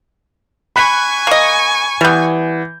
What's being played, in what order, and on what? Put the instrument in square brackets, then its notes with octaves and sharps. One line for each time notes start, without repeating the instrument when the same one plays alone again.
[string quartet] G#5 C#6 [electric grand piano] B5 F#6 B6
[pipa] A#3 D#5
[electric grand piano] E3 G6 [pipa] G3 B3